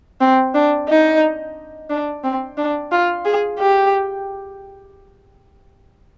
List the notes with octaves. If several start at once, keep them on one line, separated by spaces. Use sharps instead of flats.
C4
D4
D#4
D4
C4
D4
F4
G#4
G4